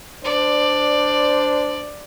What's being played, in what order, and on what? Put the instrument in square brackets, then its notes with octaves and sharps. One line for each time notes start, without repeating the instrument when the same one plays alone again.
[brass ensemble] D4 C5 [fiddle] D5